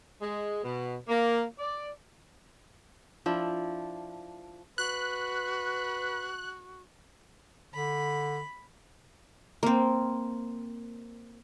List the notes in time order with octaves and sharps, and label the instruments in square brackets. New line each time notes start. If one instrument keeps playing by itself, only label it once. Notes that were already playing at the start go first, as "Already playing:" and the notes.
[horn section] G#3
B2
A#3
D5
[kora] F3 D4 E4
[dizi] F#4 [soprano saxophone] B4 [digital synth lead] F#6
[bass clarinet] D3 [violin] B5
[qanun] A#3 C4